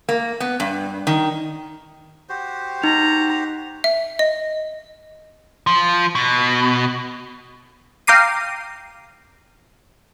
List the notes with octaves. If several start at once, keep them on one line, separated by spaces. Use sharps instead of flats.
A#3
B3
G2
D#3
F#4 G4 C5
D#4 A#5
E5
D#5
F3
B2
F5 G5 A#5 D6 C7 D#7